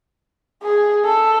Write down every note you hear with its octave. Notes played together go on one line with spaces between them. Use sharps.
G#4
A4